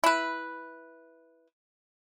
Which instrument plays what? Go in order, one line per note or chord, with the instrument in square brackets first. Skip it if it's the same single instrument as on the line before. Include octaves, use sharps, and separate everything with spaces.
[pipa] E4 B4